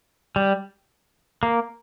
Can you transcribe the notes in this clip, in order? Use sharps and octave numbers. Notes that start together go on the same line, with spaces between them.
G3
A#3